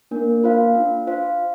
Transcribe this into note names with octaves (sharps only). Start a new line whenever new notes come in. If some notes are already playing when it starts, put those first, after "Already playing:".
A#3 D4
F4 C5 F5
D4
F4 C5 F5